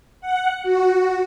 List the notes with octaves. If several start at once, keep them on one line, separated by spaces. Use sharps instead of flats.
F#5
F#4